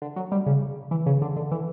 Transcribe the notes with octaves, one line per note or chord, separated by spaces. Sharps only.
D3
F#3
G3
C#3
E3
C#3
D3
D3
E3